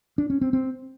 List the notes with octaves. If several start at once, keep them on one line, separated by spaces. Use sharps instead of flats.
D4
C#4
C4
C4